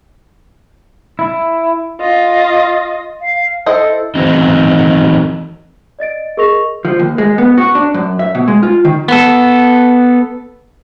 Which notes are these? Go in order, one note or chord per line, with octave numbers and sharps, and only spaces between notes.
E4
F4 D#5
F5
E4 A4 C5 D#5
D#3 E3 F#3 A3 C4 D#4
D5 D#5 A6 D7
G#4 A#4 D#5 C#6 A#6 F7
F3
D#2
G#3
B3
F#4
D4
F#2
E5
B2
G#3
F4
D#3
B3 A4